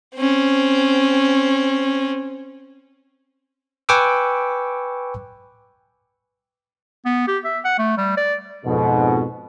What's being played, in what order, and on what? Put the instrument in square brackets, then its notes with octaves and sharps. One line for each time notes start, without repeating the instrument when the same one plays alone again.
[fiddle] C4 C#4
[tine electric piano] B4 G5 G#5 C#6 D6 E6
[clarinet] B3
G4
E5
F#5
A3
G3
D5
[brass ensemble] F2 G#2 B2